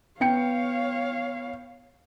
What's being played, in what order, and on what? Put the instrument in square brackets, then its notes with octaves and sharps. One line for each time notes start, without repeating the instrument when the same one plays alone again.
[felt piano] B3 G5 C#7 [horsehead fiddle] C#5 F5